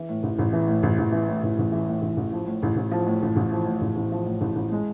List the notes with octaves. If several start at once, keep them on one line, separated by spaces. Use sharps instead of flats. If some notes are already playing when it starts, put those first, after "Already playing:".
Already playing: E3
A2
A1
A1
E3
A2
A1
A1
E3
A2
A1
A1
E3
A2
A1
A1
F3
A2
A1
A1
F3
A2
A1
A1
F3
A2
A1
A1
F3
A2
A1
A1
G#3